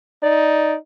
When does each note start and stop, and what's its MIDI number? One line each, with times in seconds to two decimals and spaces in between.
0.23 0.77 63
0.23 0.74 74